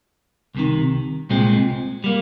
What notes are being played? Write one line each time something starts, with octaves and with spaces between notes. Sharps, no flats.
C2 C3 D#3
C2 A#2 G#3 C4
G3 A#3